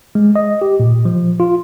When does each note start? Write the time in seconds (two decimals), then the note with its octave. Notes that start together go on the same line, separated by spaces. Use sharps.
0.15 G#3
0.36 D#5
0.62 G4
0.80 A#2
1.05 F3
1.40 F4